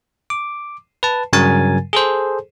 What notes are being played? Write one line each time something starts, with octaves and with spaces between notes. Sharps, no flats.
D6
B4 A5
G2 C#3 F#3 A#4 G#5 A6
G#4 A4 C5